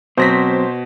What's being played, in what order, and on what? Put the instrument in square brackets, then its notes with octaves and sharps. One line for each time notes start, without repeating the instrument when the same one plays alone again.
[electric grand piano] B2 [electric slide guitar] F#3 C4 [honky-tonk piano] C5 A#6 B6